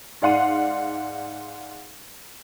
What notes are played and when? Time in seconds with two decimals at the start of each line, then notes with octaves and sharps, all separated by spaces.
0.22 G#2 D5 F5 F#5 C6 D#7